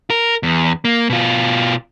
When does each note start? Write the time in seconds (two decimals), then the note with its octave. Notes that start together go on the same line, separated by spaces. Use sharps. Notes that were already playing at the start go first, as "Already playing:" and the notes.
0.10 A#4
0.43 E2
0.85 A#3
1.10 B2 F4